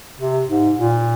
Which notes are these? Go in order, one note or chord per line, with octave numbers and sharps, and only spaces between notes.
C3
G#2
A#2